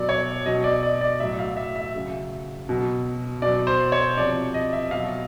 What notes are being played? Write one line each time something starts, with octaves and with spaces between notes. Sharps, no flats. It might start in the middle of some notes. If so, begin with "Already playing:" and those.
Already playing: B2 F#3 D5
C#5
B2 F#3 D#5
D5
D5
D5
A2 F#3 E5
F5
E5
E5
C#3 F#3
B2 F#3
B2 F#3 D5
C5
C#5
C3 F3 D5
D#5
E5
B2 F#3 F5